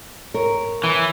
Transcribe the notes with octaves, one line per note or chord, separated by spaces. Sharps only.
A#4 C#5
E3